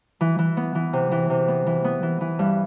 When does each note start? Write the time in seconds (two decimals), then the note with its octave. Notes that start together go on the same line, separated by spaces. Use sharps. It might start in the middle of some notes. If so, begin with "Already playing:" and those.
0.21 E3
0.39 E3
0.57 B3
0.75 E3
0.93 C3
1.11 E3
1.30 C3
1.48 B3
1.67 E3
1.84 B3
2.03 E3
2.21 E3
2.39 G2